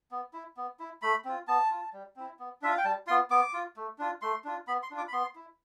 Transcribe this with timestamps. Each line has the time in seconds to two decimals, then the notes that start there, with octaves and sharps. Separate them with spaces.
0.11 B3
0.33 E4
0.57 B3
0.79 E4
1.02 A3 B5
1.25 C4 F4
1.48 B3 A5
1.70 F4
1.93 G3
2.16 C4 E4
2.39 B3
2.62 D4 F4 E5
2.71 F5
2.78 G5
2.84 G3 A5
3.07 B3 F4 C6
3.30 B3 D6
3.53 F4
3.77 A3
3.98 D4 F4
4.22 A3 C6
4.44 D4 F4
4.67 B3 B5
4.83 C6
4.91 D4 F4
4.97 D6
5.08 B5
5.13 B3 C6
5.35 E4